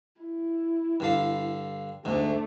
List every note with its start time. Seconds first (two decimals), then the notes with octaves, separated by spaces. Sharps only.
0.20 E4
1.00 G2 D3 F5
2.05 D2 G#2 A3 D4